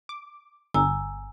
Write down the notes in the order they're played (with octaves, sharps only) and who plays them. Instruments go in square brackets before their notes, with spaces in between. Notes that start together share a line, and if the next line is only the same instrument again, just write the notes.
[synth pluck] D6
[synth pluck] G1 [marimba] G#5 A#5 E6